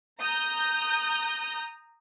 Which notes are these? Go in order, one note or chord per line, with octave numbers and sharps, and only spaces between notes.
A#5 D#6 G6